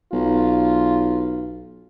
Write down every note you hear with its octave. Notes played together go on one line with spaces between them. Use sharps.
B1 F4